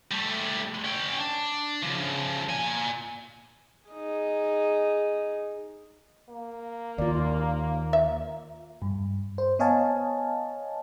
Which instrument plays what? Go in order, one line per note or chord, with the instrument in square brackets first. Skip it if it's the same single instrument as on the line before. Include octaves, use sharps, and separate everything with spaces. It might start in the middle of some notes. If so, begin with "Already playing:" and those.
[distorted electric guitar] G3 A3
C#4 G5
D4
C#3 F3
A#2 G#5
[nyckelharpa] D#4 G#4
[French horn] A#3
[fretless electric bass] D#2 [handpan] F4 D5
[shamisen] E5
[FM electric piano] G2
C5
B3 C#5 D#5 F5 G#5 A5